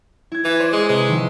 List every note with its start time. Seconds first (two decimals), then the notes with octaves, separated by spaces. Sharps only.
0.32 E4 G#6
0.45 E3
0.60 C5 D5
0.73 G#3
0.89 C3 G#3 B4 D7
1.08 D#3 F3